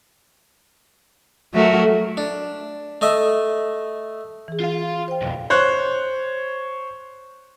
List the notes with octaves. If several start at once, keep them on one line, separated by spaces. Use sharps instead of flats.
F#3 A3 F#4 A#4 E5
D4
A3 D#5 E5
E3 G#4
F4 F5
C5 G5
B1 F2
C5 C#5 F#6